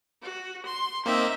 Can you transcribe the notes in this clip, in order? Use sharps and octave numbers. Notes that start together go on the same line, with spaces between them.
F#4
C6
A#3 C4 D#4 E5